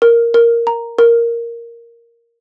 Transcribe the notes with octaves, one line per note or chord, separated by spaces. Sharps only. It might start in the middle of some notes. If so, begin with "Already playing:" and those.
A#4
A#4
A#5
A#4